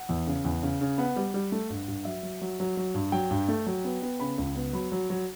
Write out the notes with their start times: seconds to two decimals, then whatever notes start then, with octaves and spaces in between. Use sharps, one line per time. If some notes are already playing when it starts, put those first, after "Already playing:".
Already playing: F#5
0.09 E2
0.27 C#3
0.45 E2
0.63 C#3
0.81 C#3
0.98 B3 F#5
1.16 G3
1.34 G3
1.52 A3
1.70 G2
1.88 G2
2.05 F#3 E5
2.23 F#3
2.42 F#3
2.60 F#3
2.77 F#3
2.94 G2
3.12 F#3 G5
3.31 G2
3.49 A3
3.66 F#3
3.85 B3
4.02 B3
4.20 C#3 B5
4.38 C#2
4.56 B3
4.73 F#3 B5
4.92 F#3
5.10 F#3